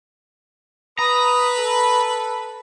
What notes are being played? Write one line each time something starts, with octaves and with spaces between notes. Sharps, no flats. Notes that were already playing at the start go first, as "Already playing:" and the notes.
B4 A#5 B5 D#6
A4